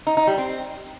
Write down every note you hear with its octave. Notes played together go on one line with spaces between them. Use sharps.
D#4
D#4
G3
C4